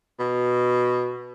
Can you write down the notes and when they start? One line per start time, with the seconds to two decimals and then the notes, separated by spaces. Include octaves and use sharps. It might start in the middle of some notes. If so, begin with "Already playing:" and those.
0.19 B2